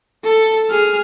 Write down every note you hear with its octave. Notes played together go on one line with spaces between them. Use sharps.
A4
G#4 F6